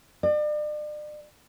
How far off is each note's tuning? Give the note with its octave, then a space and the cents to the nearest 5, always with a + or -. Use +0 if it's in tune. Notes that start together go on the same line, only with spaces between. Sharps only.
D5 +40